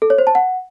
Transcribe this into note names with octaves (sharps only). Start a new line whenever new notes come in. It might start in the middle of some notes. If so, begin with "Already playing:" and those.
A4
C#5
C5
A5
F#5